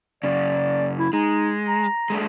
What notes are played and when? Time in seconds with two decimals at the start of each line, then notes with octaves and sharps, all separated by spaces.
0.23 F#2 C#3 D5
0.99 E4
1.13 G#3 D#4
1.68 A#5
2.10 G#3 A3 D4